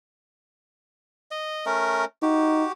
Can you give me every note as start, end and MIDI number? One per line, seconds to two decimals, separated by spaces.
1.31 1.65 75
1.66 2.05 57
1.66 2.05 61
1.66 2.05 70
2.22 2.64 63
2.22 2.72 66
2.22 2.72 67